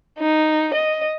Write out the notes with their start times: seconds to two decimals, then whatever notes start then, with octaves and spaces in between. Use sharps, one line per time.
0.20 D#4
0.74 D#5